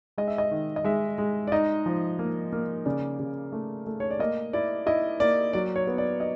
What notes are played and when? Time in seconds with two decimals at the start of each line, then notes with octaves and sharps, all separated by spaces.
0.18 G#3 D#5
0.28 E5
0.38 D#5
0.51 D#3
0.76 D#5
0.84 G#3 E5
1.18 G#3
1.47 D5
1.52 D#4 D#5
1.86 F3
2.19 A#3
2.52 A#3
2.86 C#3 D5
3.19 C#3
3.52 A3
3.87 A3
4.00 C#5
4.10 D5
4.19 A#3 D#5
4.53 E4 D5
4.86 E4 D#5
5.20 A#3 D5
5.53 F#3 D5
5.76 C#5
5.87 B3
5.98 D5
6.20 D#5